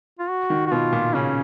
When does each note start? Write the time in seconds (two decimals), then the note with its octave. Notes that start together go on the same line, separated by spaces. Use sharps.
0.19 F4
0.30 F#4
0.50 D#3
0.67 F#4
0.72 B2 F4
0.93 A#2
1.15 C#3 C#4